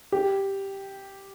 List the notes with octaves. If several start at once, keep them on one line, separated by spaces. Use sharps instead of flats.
G4